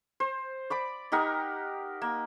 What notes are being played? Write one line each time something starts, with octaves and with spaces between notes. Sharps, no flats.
C5
D5 B5 D6
D#4 G4 A#4 F#5
A#3